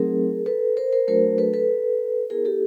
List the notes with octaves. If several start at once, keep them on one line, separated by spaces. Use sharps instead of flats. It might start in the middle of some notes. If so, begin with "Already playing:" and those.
Already playing: F#3 A3 C4 D#4 G#4 A#4
A4 B4
A#4 C5
A#4 C5
F#3 A3 D4 F#4 A#4 C5
A4 B4
A4 B4
B3 E4 G#4 A#4
G4 A4